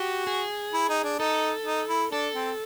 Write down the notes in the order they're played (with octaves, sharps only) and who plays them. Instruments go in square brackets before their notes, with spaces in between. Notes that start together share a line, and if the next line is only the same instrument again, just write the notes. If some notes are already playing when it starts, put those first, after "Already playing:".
Already playing: [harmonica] F#4 [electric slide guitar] G4
[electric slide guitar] G#4
[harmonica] E4
D#4
D4
[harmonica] D#4 [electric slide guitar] A4
[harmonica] D#4
E4
[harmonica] D4 [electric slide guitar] A4
[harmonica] C4